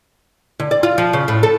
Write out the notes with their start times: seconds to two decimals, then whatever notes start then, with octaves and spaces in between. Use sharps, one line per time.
0.60 D3
0.71 D5
0.83 F4
0.98 F3
1.13 C#3
1.28 A2
1.43 A4